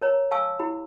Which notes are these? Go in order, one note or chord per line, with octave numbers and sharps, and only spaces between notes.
A#4 C#5 A#5
F5 G#5 A5 C#6 E6
E4 G4 B5